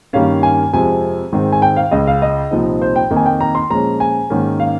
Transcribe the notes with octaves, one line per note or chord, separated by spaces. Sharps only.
G2 D#3 G3 A#3 C#4 F5
G#5
F2 C3 F3 G#3 G#5
G#2 D#3 G#3 C4
G#5
G5
F5
C#2 C#3 G#3 D#5
F5
D#5
C2 A#2 F3 C4 D#4
C5
G5
F2 D#3 A#3 D#4
G#5
G5
A#5
C6
A#2 F3 G#3 C#4 A#5
G#5
G#2 D#3 A#3 C#4
F5